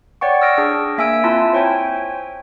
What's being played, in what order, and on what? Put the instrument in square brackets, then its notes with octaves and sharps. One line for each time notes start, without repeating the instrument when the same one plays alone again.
[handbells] C#5 D5 F#5 G5 C#6
E6 F6 A#6 D7
D4 G#4
A#3 E5 G#5 E6 D7
C4 E4 F4 E5 A5 C6
C5 C#5 G5 G#5